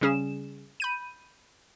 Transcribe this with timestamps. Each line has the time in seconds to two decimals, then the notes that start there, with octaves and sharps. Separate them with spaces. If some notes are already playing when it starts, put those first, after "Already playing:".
0.01 C#3 G3 C#4 G#4 E7
0.80 B5 G6 D#7